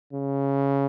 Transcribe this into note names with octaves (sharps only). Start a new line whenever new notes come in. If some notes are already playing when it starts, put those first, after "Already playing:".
C#3